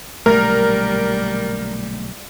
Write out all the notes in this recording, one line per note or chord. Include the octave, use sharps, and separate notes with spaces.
B1 A#2 D3 G3 A3 A#4